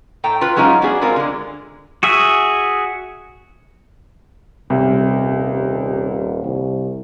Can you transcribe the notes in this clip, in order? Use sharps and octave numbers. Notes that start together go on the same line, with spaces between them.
A2 A4 G5 A#5
F4 B4
F#3 G#3 C#4 D#4 F4
B3 D4 F#4 G#4
G#3 C4 F4 A#4
D3 G#3
F#4 G#4 E5
D#1 C2
C2